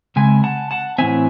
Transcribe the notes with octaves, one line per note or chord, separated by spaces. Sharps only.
C#3 G#3 C4 E5 G#5
F#5 A5
F#5 A5
A2 E3 C4 E5 G#5